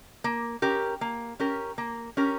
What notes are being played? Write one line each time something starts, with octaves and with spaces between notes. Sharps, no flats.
A#3
C#4 G4 A#4
A#3
C#4 G4 A#4
A#3
C#4 G4 A#4